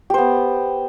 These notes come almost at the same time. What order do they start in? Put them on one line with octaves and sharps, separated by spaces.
G4 C5 B3